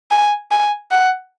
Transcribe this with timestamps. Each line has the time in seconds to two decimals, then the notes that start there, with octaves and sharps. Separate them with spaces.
0.11 G#5
0.51 G#5
0.92 F#5